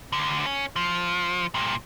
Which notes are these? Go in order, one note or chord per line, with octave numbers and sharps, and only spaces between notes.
D2 D3
C#4
F3
G2 A#2